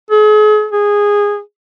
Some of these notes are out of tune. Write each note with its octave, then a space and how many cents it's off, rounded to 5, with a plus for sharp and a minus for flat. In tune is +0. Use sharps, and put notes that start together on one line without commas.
G#4 +40
G#4 -15